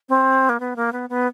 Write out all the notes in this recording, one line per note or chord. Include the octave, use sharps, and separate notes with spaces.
C4
A#3
B3
A#3
B3
B3